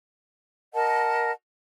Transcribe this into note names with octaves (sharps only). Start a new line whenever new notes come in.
A#4 D#5 F#5 A5